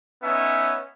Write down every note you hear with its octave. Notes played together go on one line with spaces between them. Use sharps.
B3 C#4 D#4 E5